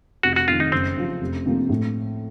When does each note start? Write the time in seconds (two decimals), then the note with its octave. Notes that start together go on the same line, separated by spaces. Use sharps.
0.23 F1 F#4
0.36 F#4
0.48 F2 D#3 F4
0.60 D#4
0.72 F#1 C4
0.97 F#2 F3
1.21 F1
1.46 F2 C3 F3 A#3
1.69 A2